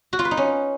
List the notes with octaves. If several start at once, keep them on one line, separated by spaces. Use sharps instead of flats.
F#4
F4
B4
D#4
C#4